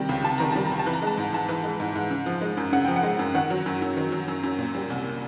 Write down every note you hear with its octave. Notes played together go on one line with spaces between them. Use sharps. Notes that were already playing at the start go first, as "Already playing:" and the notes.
Already playing: C3 D#3 G3 G5
C#2
C3 A5
D#3 A#5
G3 A5
A#5
C#2
A5
E3
A#5
G#3 A5
G#2 A#5
G#2 A5
E3
G#3
G#2
G#2
C#3
F3
G#3
F#2
C#3 F#5
F3 G5
F#5
G#3
F#2
D#3 F#5
F#3
F#2
F#2
D#3
F#3
F#2
F#2
A#2
G3
C2